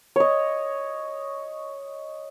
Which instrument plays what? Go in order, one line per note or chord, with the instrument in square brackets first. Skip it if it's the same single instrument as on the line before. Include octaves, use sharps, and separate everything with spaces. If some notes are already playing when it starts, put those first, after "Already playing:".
[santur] C#5 D#5